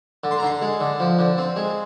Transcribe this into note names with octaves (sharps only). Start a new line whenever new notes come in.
D3
C6
A#5
D3 C6
G#3
D3
F3
D3
C4
G#3